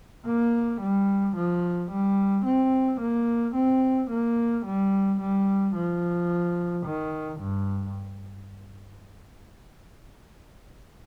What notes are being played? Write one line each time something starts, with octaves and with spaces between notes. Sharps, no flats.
A#3
G3
F3
G3
C4
A#3
C4
A#3
G3
G3
F3
D#3
G2